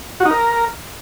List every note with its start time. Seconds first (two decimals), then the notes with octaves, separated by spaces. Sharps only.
0.20 F#4
0.25 D#4
0.31 A#4